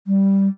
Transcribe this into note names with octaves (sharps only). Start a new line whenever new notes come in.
G3